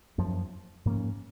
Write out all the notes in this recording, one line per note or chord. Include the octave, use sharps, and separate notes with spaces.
F#2 F3 A#3
G#2 F3 A#3 C#4